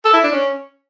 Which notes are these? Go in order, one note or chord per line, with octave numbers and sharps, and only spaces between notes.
A4
E4
D4
C#4